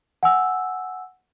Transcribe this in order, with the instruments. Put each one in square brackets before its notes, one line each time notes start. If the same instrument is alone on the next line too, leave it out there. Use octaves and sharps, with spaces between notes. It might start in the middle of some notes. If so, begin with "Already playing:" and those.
[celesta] F#5 G#5 E6